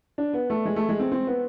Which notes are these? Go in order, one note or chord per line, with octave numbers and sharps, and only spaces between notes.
D4
B3
A3
G#3
A3
G#3
C4
C4
B3